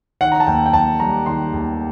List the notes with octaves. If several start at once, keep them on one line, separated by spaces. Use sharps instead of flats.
D#3 F#5
A#5
A5
D#2 G5
G5
D#2 A5
G3 A#5
D#3 C6
D#2